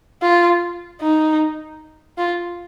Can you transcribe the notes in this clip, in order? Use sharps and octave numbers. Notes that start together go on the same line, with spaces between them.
F4
D#4
F4